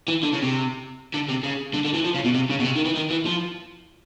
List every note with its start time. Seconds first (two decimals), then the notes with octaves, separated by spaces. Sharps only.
0.08 E3
0.23 D3
0.33 C#3
0.43 C3
1.14 D3
1.28 C3
1.43 C#3
1.74 D3
1.84 D3
1.94 E3
2.04 F3
2.14 C#3
2.24 B2
2.34 C3
2.50 C#3
2.60 B2
2.65 C3
2.75 D#3
2.85 E3
2.95 D#3
3.10 E3
3.26 F3